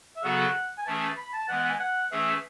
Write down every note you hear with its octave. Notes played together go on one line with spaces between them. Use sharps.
E5
C#3 F#3 B3 F#4 A4 F#5
G#5
E3 A3 C#4 G#4 A5
B5
A5
E3 G#3 B3 F#5
F#5
G#5
F#5
E3 A3 C#4 G#4 E5